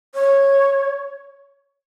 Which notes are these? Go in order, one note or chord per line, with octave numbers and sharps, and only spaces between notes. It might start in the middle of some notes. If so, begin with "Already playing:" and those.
C#5